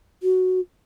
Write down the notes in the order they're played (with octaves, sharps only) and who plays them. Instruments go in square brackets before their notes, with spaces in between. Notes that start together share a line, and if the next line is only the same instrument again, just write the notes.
[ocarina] F#4